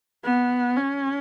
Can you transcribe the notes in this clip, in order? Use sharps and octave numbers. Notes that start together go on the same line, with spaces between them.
B3
C#4